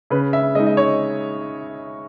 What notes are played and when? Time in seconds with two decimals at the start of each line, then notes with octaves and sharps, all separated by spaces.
0.10 C#3 B4
0.33 E5
0.55 G#3 D#4 D#5
0.66 D#5
0.77 C#5